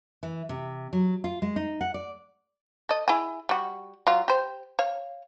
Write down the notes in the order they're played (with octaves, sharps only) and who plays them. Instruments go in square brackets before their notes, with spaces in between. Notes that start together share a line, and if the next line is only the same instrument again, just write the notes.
[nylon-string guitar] E3
C3
F#3
F4
G#3
D#4
F#5
D5
[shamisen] A4 D#5
E4 G#4 G#5
G3 F#4
F#3 F4
G4 C5
C#5 F5